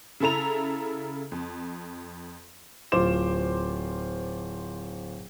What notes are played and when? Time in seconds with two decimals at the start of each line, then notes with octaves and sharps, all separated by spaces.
0.20 C#3 E4 A4 A#5 F7
1.32 F2
2.92 D1 F4 C5 D6 E7